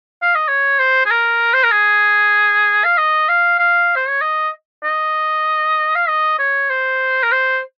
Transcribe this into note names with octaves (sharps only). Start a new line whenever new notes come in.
F5
D#5
C#5
C5
G#4
A#4
C5
A#4
G#4
F5
D#5
F5
F5
C5
C#5
D#5
D#5
F5
D#5
C#5
C5
A#4
C5